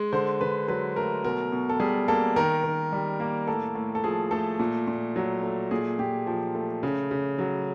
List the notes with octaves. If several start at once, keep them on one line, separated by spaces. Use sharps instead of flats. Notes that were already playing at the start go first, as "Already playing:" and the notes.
Already playing: G#3
D3 C5
D3 B4
F#3 B4
A3 A#4
B2 A#4
B2
A4
G3 G#4
A#3 A4
D#3 A#4
D#3
G3
A#3
A2 A4
A2
A4
F3 G#4
A3 A4
A#2
A#2
F#3
A3
A#2 G#4
A#2 G4
F3
A3
C#3
C#3
F#3